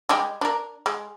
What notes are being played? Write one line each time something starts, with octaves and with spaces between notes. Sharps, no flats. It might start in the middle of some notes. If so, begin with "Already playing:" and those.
G3 G#3 G4
D4 A#4
G#3